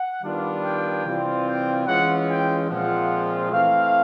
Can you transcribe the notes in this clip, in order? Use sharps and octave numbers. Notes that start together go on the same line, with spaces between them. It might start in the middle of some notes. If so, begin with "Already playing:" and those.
Already playing: F#5
D#3 G3 B3 D4 F4
G5
C3 E3 G3 C4 F4
G5
E3 G#3 C#4 F4 F#5
G5
A#2 F3 G#3 C4 F4 F#5
E3 A3 C4 F5